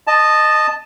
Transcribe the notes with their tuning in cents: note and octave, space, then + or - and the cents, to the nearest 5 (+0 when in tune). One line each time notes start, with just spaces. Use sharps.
D#5 -15 A5 +0